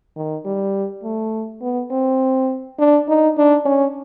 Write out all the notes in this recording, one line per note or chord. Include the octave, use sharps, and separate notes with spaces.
D#3
G3
A3
B3
C4
D4
D#4
D4
C#4